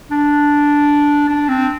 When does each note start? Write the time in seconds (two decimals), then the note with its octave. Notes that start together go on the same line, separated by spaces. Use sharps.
0.11 D4
1.28 D4
1.49 C4